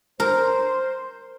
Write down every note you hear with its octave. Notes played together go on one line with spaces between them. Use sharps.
A#4 C5